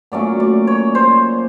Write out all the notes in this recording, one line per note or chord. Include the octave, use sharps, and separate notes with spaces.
A#2 F#3 A3 C#4 D5
D5
C#5
C5